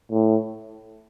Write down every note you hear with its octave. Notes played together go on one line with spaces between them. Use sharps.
A2